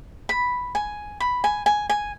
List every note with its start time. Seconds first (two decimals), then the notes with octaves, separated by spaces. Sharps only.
0.29 B5
0.75 G#5
1.20 B5
1.44 G#5
1.66 G#5
1.89 G#5